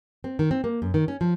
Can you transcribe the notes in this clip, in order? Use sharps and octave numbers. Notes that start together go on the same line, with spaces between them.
C4
D#3
C4
A#3
F#2
D#3
C#4
F3